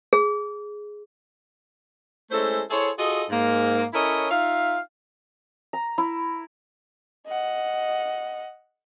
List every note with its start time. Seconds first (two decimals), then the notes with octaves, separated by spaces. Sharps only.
0.13 G#4
2.31 G#3 A3 C#4 E4 A4 C5
2.70 E4 G#4 A4 C5 C#5
2.98 F4 F#4 G#4 A4 D#5
3.29 G#2 A#3
3.94 C#4 E4 A4 A#4 C#5 D#5
4.30 D#4 F4 E5 F5
5.73 A#5
5.98 E4
7.27 D#5 F#5